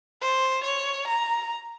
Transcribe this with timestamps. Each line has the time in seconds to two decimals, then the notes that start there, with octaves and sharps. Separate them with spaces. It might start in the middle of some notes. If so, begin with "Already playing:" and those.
0.21 C5
0.64 C#5
1.08 A#5